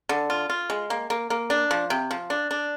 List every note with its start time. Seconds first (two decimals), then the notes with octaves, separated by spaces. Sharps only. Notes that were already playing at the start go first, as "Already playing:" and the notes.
0.09 D3
0.30 F4
0.50 F4
0.70 G#3
0.90 A#3
1.10 A#3
1.30 A#3
1.50 D4
1.71 F3
1.90 C3
2.11 F3
2.30 D4
2.51 D4